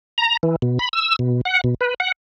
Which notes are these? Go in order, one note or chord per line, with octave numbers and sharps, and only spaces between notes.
A#5
E3
B2
B5
E6
B2
F#5
B2
B4
F#5